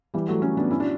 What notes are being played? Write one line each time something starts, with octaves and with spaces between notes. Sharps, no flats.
E3 G3
F#3 A3
A3 C#4
B3 D4
C#4 E4
D4 F#4